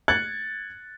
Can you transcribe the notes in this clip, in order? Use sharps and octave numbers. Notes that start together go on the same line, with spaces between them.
F#6 G#6 A6 C#7 F#7